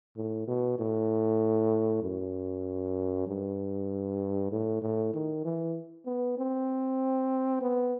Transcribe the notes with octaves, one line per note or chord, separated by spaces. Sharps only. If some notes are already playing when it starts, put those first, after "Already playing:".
A2
B2
A2
F#2
G2
A2
A2
D#3
E3
B3
C4
B3